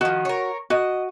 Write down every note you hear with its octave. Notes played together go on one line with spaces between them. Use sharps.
D#3 F3 F#4
A#4 C#5
F#4 D#5